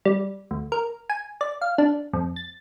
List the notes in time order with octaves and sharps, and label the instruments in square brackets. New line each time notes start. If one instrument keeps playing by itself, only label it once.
[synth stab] G3
D2
A#4
G#5
D5
F5
D4
F2
A6